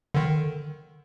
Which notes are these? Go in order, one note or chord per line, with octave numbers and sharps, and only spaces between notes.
D3 D#3